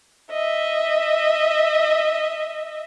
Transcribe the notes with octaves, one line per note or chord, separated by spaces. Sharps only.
D#5 E5